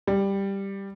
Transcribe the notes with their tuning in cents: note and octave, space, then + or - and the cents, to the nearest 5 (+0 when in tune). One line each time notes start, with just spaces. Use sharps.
G3 +5